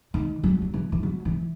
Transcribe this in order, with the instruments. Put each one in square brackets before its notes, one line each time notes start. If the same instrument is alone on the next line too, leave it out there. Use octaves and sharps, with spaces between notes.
[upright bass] D#3
F#3
F#3
E3
E3
F#3
E3